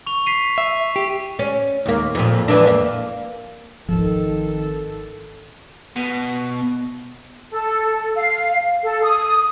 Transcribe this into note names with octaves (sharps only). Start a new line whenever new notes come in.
C#6 F7
B6 C7 D#7
E5
G4
C#4
D#2 A#3
F2 A#2
F2 E3 D4
A#3
G#1 D#3 F3 C4 A4
B2
A4
F5
A4
D#6